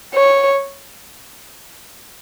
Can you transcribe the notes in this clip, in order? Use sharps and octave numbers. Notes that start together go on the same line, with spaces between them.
C#5